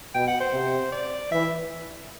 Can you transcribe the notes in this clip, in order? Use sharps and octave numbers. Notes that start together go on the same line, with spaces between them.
B2 G5
F#5
C5
C3
D5
E3 E5